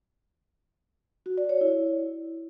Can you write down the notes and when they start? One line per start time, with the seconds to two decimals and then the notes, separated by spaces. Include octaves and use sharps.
1.26 F#4
1.38 D5
1.49 C#5
1.61 E4